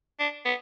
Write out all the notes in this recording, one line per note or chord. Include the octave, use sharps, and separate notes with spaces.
D4
B3